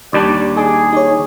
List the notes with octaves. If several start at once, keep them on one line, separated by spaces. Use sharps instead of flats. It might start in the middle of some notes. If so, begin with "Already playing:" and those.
D#2 G3 D4 D5
D#4 G#4 G#5 D6
D#4 C#5